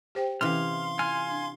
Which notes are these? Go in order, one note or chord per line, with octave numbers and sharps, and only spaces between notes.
G4 C5 G5
C3 E3 C#4 F5 C6 F6
F4 G#5 F6
D4